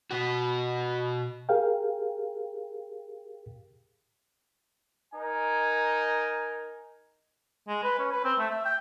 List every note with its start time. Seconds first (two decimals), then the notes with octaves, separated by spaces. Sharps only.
0.11 B2 F#4
1.49 G4 G#4 A#4 F5 G5
5.14 D#4 A#4 G#5
7.68 G#3
7.83 B4
7.99 C#4
8.12 B4
8.24 C4
8.39 A3
8.51 E5
8.65 G5